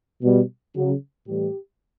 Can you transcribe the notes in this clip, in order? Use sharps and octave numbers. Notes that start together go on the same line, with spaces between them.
B2 G3
C#3 F#3
A2 E3 G3 G4